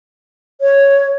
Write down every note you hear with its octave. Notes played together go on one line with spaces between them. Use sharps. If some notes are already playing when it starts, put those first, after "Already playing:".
C#5